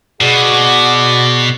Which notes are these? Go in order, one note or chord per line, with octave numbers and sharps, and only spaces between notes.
B2 F#4 G#4 D5